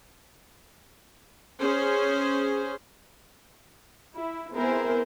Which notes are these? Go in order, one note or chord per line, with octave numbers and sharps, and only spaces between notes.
C#4 G#4 C5
E4
B3 C4 E4 G#4 A#4 C5